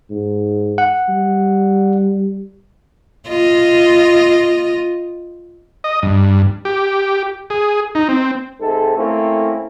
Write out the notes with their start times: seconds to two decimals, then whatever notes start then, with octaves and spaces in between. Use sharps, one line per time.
0.10 G#2
0.78 F#5
1.09 G3
3.29 F4 D#5
5.84 D#5
6.02 G2
6.65 G4
7.50 G#4
7.95 D#4
8.09 C4
8.60 G#2 C3 A4
8.97 A3 A#3 C4 C#4 E4